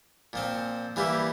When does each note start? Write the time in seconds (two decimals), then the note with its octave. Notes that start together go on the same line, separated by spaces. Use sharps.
0.33 A#2 F3 C4
0.96 E3 G3 A#3 E4 G4